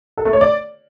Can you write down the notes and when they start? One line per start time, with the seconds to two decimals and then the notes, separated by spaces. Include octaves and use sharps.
0.17 A4
0.25 A3
0.33 C#5
0.41 D5